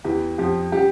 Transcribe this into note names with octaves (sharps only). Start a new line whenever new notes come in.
E2 E3 G4
F2 F3 G4
G3 G4